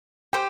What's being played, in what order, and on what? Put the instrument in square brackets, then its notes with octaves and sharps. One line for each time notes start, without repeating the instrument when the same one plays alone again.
[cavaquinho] G4 C5 [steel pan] G5